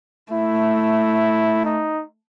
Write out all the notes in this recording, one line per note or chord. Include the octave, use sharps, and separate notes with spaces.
A3 E4
D#4